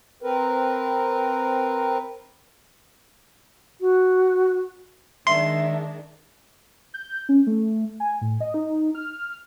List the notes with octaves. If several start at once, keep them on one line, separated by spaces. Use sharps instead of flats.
C4 A#4 B4
F#4
D#3 G#3 D4 E5 C6
G6
C#4
A3
G#5
A2
D#5
D#4
F6